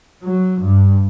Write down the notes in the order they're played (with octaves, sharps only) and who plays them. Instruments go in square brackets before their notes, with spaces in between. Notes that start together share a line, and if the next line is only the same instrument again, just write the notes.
[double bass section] F#3
G2